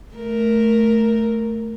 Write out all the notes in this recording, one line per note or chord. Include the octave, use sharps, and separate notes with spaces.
A3 A#4